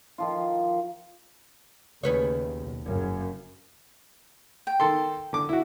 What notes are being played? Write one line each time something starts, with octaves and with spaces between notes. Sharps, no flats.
D#3 F3 F4
D#2 C#3 B4 C#5
B1
F#1 F#2 C#3
G5
D#3 A4 C6
D3 D6
E4 F#4